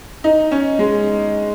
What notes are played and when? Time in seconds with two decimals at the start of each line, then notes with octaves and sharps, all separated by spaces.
0.24 D#4
0.51 C#4
0.79 G#3